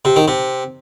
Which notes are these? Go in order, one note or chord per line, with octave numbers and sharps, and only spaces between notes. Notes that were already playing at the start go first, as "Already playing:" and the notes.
C3
D#3
C3